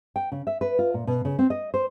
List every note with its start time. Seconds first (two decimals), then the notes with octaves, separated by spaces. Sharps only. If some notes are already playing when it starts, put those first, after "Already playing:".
0.16 G5
0.32 C#3
0.47 E5
0.61 B4
0.79 F4
0.94 A#2
1.07 B2
1.25 C#3
1.39 C4
1.50 D#5
1.74 C5